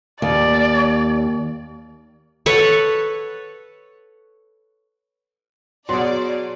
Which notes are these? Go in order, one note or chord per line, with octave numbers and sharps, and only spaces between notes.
D#2 D5
A4 B4 C#5 F#5
B2 F#3 B3 F#4 G#4 D5 C6